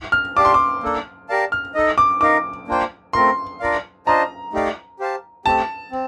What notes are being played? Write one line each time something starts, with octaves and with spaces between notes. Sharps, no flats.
F6
D4 G4 D5 F5 A5 D6
C6
D6
A#3 D4 A4
G4 A#4 D5 F5 A5
F6
D#4 A4 D#5
D6
D#4 A#4 F5 D6
A#3 D4 F4 C5 G5
A3 C4 F4 A#4 C6
D4 F4 A#4 D5 F5
D4 F4 C5 D#5 A5 A#5
A3 D#4 G4 D5 F5
G4 C5 F5 A5
A3 C4 G4 A5
C4